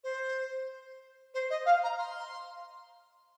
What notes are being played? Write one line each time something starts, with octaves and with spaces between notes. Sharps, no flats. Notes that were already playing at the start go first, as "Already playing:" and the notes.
C5
C5
D#5
F5
A#5
C6